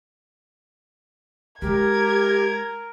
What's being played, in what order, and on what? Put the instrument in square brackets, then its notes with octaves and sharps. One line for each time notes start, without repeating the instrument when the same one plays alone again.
[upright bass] G#3 [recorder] G4 [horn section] A#4 [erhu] G#6